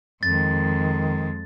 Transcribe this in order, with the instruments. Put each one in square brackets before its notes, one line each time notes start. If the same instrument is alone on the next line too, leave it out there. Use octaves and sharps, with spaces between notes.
[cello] F2 G#3 [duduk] D#3 [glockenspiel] A6